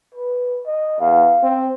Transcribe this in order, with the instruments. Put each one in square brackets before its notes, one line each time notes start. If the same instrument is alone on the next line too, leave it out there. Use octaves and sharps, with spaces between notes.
[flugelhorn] B4
D#5
[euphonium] E2 [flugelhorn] F5
[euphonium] C4